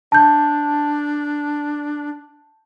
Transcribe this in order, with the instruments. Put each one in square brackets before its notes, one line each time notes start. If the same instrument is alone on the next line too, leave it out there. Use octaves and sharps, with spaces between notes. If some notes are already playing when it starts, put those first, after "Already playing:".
[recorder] D4 [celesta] A5 G6